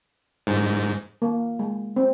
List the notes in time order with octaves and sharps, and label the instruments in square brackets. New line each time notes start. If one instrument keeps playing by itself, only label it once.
[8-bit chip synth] G#2
[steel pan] A#3
G#3
C4